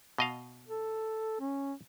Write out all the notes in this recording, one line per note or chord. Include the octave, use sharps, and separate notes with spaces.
B2 D#5 F5
A4
C#4